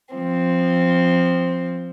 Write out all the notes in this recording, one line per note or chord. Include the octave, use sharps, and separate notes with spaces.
F3 C4